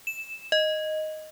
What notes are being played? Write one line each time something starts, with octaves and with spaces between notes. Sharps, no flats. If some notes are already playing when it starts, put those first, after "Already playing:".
E7
D#5